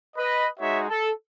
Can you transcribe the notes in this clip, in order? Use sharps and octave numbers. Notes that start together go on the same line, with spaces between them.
B4 D#5
G#3 D#4 F#4 C#5 E5
A4